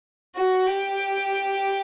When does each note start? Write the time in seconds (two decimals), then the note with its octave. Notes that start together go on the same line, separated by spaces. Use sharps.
0.36 F#4
0.66 G4